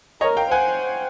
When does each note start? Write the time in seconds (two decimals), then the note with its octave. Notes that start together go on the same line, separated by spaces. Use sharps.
0.21 A#4 C#5 D#5
0.37 F5 G5
0.51 C5 F#5 G#5